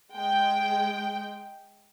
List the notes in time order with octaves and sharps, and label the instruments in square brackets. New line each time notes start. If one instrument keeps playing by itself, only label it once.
[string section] G#3 G5